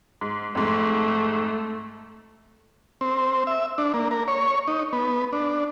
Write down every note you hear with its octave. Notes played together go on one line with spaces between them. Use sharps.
G#2
F2 G#2 A3
C4
E5
D4
A#3
A#4
C#5
D#4
B3
D4